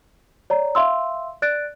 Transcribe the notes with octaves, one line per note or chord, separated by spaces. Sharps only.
C#5 D5 A#5
E5 F5 C6 E6
D5 F#6 A6 D7